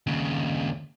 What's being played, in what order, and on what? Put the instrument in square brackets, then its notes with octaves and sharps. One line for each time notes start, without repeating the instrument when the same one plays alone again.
[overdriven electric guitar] D#2 C#3